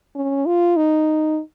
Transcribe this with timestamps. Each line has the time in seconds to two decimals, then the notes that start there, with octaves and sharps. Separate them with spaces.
0.16 C#4
0.46 F4
0.77 D#4